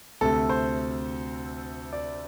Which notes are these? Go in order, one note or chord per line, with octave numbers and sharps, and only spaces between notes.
D2 C3 A3 A4
C5
D5